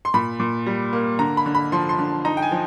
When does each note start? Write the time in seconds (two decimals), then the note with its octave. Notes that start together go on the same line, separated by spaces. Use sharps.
0.05 C6
0.14 A#2 B5
0.40 A#2
0.67 G3
0.93 A#3
1.19 D3 A#5
1.37 B5
1.46 D3
1.55 B5
1.72 F3 C6
1.89 C6
1.99 D3
2.25 D#4 A#5
2.37 G5
2.42 G#5
2.52 F3